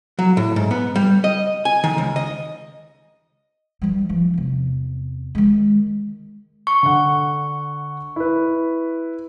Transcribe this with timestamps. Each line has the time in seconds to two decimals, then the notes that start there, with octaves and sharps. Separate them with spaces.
0.19 F#3
0.37 A2
0.56 G#2
0.71 B3
0.95 G3
1.24 D#5
1.65 G#5
1.84 D#3
1.98 C#2
2.16 D#5
3.82 E3 G3
4.09 E3 F3
4.34 E2 C3
5.35 D#3 G#3
6.67 C#6
6.83 D3 F#5
8.16 E4 B4